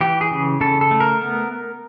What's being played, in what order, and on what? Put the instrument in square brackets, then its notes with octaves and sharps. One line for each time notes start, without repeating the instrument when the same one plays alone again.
[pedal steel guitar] E3 G4
G#4
C#3
C#3 A4
A4
A3
A#4
B3